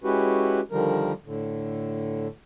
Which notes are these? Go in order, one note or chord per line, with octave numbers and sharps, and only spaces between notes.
G#3 C#4 E4 F#4 G4 B4
D3 D#3 F3 G3 A#4
A2 D3